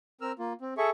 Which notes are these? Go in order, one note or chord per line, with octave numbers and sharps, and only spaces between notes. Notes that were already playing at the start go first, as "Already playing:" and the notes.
C4 A#4 E6 F6
A#3 F4
C4
G#4 A4 E5 C#6